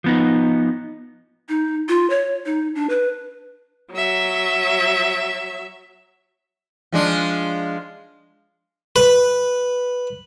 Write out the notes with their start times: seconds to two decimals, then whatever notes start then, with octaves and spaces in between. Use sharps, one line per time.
0.04 F3 B3 D#4
1.49 D#4
1.89 F4
2.10 C#5
2.46 D#4
2.75 D4
2.89 B4
3.92 F#3 E5
6.92 F3 G#3 D4
8.96 B4